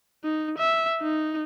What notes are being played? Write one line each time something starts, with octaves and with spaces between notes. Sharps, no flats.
D#4
E5
D#4